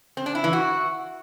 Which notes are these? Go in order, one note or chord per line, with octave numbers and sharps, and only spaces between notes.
C4
D4
E4
E3
F#4